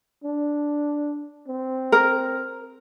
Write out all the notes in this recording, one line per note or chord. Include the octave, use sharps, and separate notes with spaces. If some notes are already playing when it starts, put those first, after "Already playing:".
D4
C4
A#4